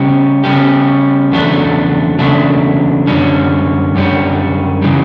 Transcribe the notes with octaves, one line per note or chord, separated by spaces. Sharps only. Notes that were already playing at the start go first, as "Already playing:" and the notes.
Already playing: C#3 G3 C#4 G4
C#3 G3 C#4 G4
E2 C#3 F#3 A3 D4
E2 C#3 F#3 A3 D4
F#2 D3 G3 C#4
F#2 D3 G3 C#4
C#3 E3 G3